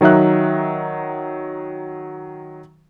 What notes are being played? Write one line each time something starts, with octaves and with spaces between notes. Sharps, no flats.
D#3 F#3 D#4 E5 F#6